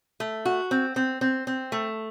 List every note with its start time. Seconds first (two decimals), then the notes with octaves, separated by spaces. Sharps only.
0.20 A3
0.45 F#4
0.71 C4
0.96 C4
1.21 C4
1.47 C4
1.72 A3